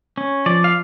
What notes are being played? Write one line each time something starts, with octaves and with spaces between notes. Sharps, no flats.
C#4
F3 D5
F5